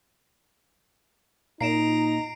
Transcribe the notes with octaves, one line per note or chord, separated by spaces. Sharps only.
A#2 D#4 A#5 C7 D7 E7